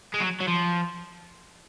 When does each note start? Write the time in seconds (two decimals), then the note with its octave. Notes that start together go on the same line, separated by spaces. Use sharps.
0.14 G#3
0.20 F#3
0.41 F#3
0.48 F3